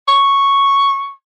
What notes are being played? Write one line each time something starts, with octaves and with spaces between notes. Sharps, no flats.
C#6